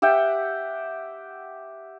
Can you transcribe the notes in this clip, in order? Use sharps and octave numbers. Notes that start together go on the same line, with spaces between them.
G4 E5 F#5 G5